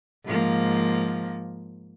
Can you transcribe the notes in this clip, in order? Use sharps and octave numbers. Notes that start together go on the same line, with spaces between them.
G#2 F3 A#3